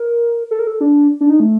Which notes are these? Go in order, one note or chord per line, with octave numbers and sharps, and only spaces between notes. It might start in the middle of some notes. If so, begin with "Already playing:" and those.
Already playing: A#4
A4
A#4
A4
D4
D4
D#4
A3